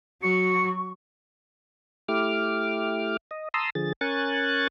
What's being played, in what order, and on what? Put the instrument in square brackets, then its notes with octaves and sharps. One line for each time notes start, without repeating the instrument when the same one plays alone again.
[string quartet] F#3 [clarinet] F#4 [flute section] C#6 [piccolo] C#7
[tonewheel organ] A3 E4 G4 D6 F6
D#5
A5 A#5 C6 D#6 E6
D3 F3 G#4 A6
C#4 A#4 G#5 C#6 F#6 A6